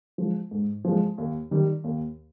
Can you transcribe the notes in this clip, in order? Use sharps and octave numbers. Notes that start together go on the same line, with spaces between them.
F3 G#3
G#2
F3 G#3
D#2
D#3 G3
D#2